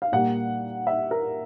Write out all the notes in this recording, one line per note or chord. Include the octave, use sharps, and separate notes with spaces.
F5
A#2 G3 A#3 F#5
E5
A#4